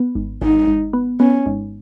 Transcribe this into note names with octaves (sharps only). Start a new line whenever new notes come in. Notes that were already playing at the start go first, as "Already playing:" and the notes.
Already playing: B3
G#1
G#1 D#4
G#1
B3
B3 C#4
G#1